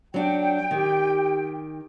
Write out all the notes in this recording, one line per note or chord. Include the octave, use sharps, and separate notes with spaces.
F#3 D4 F#4 G5
D#3 G4